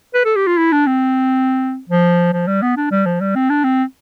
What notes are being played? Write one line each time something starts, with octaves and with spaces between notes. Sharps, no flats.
B4
A4
G4
F4
E4
D4
C4
F3
F3
G3
B3
D4
G3
F3
G3
C4
D4
C4